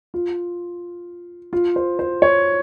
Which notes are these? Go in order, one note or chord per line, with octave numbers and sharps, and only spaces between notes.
F4
F4
C5
C5
C#5